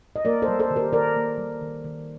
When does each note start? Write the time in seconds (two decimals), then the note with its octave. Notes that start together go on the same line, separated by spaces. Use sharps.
0.16 D#5
0.25 A#3 A#4 D5
0.42 A4 C5
0.48 G3
0.59 A4 C5
0.71 D#3
0.76 G4 A#4
0.93 D#3 A#4 D5
1.16 A#3
1.38 G3
1.61 D#3
1.84 D#3